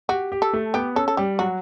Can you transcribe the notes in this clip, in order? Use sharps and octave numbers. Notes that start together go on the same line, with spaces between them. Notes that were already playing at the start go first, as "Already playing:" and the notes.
F#4 G4
G4
A4
A3
B3 G4
C#4 A4
A4
G3 G4
F#3 F#4